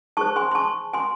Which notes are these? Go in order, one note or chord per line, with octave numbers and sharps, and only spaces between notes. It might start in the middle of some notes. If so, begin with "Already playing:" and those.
D#4 G#4 C5 A5 C#6
G#5 C6
C6
A5 C#6
G#5 C6